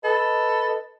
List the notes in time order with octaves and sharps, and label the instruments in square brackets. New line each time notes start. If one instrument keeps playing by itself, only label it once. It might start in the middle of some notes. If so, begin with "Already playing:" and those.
[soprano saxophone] A4 [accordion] B4 D#5